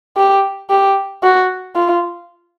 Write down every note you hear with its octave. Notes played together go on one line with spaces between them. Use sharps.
G4
G4
F#4
F4